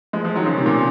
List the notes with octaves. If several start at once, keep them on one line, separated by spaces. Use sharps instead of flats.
F3 G#3
F3 G#3
D#3 F#3
C#3 F3
C3 D#3
A#2
C3